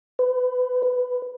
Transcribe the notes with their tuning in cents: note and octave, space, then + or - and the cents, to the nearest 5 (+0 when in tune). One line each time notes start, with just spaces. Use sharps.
B4 +35
B4 +10